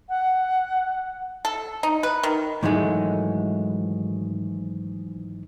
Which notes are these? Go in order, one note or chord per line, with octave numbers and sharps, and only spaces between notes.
F#5
A4
D#4
B4
D#3
G#2 D#3 E3 F#3 G#3 A3